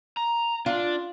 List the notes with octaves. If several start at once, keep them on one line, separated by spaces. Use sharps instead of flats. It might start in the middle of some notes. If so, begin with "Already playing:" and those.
A#5
D4 F4